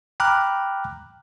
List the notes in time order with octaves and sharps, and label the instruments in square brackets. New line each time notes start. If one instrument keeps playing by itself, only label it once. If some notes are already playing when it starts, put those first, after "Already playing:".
[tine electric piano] G5 A#5 B5 D6 F6 F#6